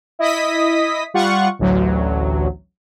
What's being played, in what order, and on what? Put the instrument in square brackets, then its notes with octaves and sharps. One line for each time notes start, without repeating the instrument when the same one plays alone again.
[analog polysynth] E4 D#5 D#6 B6
G3 F4 F#5 C#6
A1 D2 F#3